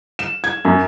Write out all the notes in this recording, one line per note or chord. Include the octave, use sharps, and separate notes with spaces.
E7
G#6
F#2